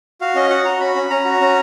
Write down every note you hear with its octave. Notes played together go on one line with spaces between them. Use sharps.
F#4 F5
C#4 D#5
F#4 F#5
F#4 A#5
C#4 B5
C#4
C#4 A#5
F#4
C#4